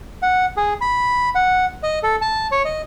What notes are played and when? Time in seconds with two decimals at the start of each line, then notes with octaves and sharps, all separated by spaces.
0.22 F#5
0.57 G#4
0.81 B5
1.35 F#5
1.83 D#5
2.03 A4
2.21 A5
2.52 C#5
2.65 D#5